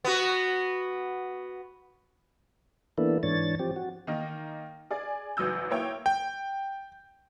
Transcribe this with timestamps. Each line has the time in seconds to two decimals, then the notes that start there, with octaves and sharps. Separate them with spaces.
0.05 B3 F#4
2.98 E3 A#3 B3 D4 E4 A4
3.23 G#2 E3 D4 C#5 A6
3.59 F3 C4 G4
3.76 F#4
4.07 D#3 A#3 D#4
4.91 G#4 D5
5.37 G#1 E3 F#3 D#6 E6 G6
5.70 A#3 E4 C#5 G5
6.06 G5